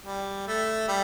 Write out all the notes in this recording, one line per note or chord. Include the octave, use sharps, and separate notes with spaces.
G3
A3
G3